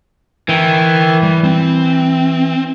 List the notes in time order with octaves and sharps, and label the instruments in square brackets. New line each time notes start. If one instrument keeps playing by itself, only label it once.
[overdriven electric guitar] E3 [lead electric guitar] A#4 G5
[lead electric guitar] G3
C4